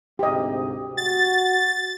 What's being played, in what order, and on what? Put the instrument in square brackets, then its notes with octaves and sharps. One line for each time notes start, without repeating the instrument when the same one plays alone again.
[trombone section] D2 G#2 C3 [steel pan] G4 D#5
[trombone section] F#4 [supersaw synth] A6